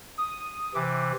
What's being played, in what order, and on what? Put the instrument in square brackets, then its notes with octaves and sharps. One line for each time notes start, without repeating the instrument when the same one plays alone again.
[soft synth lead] D#6
[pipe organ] C3 E3 [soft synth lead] D6